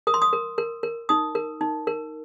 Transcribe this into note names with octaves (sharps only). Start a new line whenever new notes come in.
A#4 D#6
C6
D#6
A#4
A#4
A#4
D#4 D#6
A#4
D#4
A#4